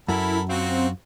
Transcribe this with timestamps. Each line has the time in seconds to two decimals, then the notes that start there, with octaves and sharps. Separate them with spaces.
0.08 F#2 E4 A4 A#4 B5
0.49 F#3 C4 F4 F#4